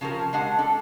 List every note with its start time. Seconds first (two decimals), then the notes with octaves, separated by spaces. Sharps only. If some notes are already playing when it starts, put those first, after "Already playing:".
0.01 C#3 F3 G4 A#4
0.33 G#3 D4 F#5
0.59 D4 A4